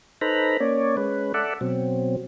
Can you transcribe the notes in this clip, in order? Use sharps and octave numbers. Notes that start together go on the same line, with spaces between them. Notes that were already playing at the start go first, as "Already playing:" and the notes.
D#4 A4 B4 C5 A#5 B5
A#3 C#4 C#5 D5
G#3 C#4 B4
A4 D5 E5 F#5
B2 F#3 C4